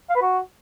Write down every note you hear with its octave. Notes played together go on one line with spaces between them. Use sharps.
F5
B4
F#4